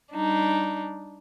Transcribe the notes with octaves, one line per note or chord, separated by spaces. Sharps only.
G3 D4 D#4